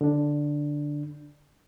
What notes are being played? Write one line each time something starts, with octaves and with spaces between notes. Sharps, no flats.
D3 D4